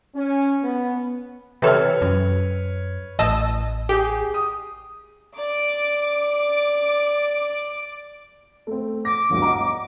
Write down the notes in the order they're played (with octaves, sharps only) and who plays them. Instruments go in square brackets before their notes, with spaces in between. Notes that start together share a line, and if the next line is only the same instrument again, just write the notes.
[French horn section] C#4
B3
[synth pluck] C3 E3 A4 [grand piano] B4 C#5 F6
[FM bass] F#2
[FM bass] A1 [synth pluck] D#5 A5 E6
[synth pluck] G4 [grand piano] G#4
[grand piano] D#6
[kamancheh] D5 D6
[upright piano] A3 C4
[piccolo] D6 [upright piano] A#6
[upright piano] G1 D2 G2
D#5 F#5 A#5